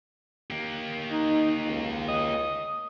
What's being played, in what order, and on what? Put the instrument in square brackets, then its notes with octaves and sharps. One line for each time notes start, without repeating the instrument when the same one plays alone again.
[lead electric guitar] A#3 G4
[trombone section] D#4
C#2
[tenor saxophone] D#5